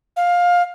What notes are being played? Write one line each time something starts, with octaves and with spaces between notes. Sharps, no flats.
F5